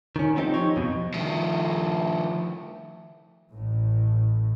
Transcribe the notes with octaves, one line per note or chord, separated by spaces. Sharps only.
D#3 C#4
F3 B3 C4 D#4 G4
D#4 C#5
F2 B2
D#3 F3 A3
A1 A2